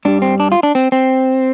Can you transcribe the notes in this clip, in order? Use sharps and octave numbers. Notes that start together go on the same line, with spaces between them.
G2 G3 D4
C4
D4
F4
D4
C4
C4